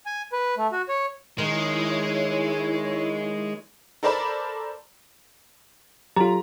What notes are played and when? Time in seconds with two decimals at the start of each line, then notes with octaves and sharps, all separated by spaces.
0.06 G#5
0.32 B4
0.58 A3
0.72 F#4
0.88 C#5
1.38 D#3 G#3 D#4 E4 C#5
4.03 A4 A#4 C5 D5 A5 B5
6.16 F#3 F4 G4 A4 A#5